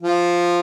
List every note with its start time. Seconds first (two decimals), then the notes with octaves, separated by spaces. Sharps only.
0.02 F3 F4